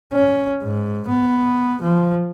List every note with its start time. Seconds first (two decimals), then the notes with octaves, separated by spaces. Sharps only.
0.13 C#4
0.63 G#2
1.09 B3
1.82 F3